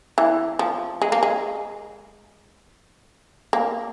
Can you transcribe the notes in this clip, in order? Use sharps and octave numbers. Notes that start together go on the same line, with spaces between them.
E3
F3
G#3
A#3
G#3
A#3